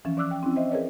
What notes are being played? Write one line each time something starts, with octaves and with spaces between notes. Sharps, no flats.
E3 F3 C#4
C#4 D5 D6 E6 F#6
G5
C4 C#4 E4
C5 D#5 E5
G#4 A#4 B4 C#5 D5